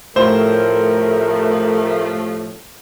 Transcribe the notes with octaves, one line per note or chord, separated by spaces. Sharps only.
A2 C3 F3 A3 A#4 C5